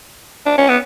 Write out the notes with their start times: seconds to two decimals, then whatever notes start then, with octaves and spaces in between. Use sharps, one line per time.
0.46 D4
0.58 C#4
0.69 B3